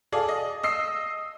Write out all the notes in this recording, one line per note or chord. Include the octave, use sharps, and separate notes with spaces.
G#4 A4 D5 F5
D#5
D#5 E6 C7